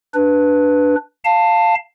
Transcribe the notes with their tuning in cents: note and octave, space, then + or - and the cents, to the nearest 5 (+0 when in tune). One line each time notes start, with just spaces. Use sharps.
D4 +0 B4 +0
F5 +0 A5 +15